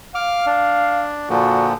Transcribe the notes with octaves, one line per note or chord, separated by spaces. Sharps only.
F5 D6 F6
D4
A#2 D3 F3 F#4